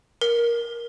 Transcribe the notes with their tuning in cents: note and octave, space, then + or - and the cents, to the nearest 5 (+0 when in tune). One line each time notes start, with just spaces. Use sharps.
A#4 +15